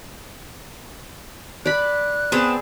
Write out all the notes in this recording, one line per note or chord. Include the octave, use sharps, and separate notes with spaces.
D5 B5 F#6
B3 C4 G#4 A5